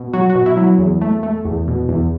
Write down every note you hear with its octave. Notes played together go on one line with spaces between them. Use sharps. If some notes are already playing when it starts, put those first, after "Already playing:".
Already playing: B2
F#3 F#4
F#4
B2
E4
F#3
E2
A3
A3
E2
B2
E2